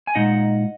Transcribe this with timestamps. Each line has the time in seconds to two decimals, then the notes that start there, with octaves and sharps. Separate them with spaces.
0.07 G#5
0.15 A#2 G#3 D#4 D#5 F#5